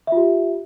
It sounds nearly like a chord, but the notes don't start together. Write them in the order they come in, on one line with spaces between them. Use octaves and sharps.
E5 F4 G4